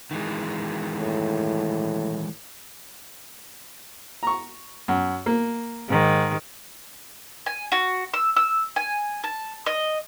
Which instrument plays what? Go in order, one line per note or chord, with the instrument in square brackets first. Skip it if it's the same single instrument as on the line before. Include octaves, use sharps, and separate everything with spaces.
[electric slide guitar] D#3 E3 G#3
[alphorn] A2
[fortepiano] A#5 C#6
F#2
A#3
[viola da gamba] G#2 D#3
[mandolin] G#5
F#4
E6
E6
G#5
A5
D#5